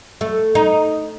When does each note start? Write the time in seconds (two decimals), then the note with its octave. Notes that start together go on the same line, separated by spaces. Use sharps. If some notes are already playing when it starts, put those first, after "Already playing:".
0.21 A3
0.55 D#4